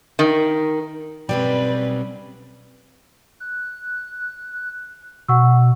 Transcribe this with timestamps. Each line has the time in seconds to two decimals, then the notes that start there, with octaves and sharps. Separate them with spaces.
0.19 D#3
1.29 B1 G3 C4 C#4 B4 D5 G5
3.40 F#6
5.28 B2 F#5 C#6 E6